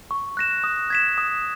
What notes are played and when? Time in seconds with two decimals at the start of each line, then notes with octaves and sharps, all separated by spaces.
0.11 C#6
0.37 F#6 A#6 E7
0.64 D#6
0.90 G#6 B6 E7
1.18 D#6